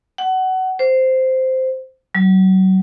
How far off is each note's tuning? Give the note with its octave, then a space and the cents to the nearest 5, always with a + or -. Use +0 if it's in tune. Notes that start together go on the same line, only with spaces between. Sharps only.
F#5 +20
C5 -10
F#3 +35